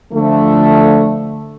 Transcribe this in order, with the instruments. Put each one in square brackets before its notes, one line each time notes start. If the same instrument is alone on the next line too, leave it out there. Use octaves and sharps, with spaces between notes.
[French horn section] D3 F3 A3